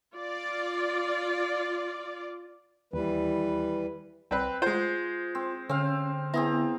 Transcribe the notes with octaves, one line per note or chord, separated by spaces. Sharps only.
F4 D5
D#2 E3 G3 B4
C2 C4 B4
G#3 F4 C5
C4
D3 C4 C#4 F5
B3 C4 E4 G#4 A#5